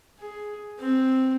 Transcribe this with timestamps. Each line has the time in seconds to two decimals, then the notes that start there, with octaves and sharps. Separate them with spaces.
0.19 G#4
0.79 C4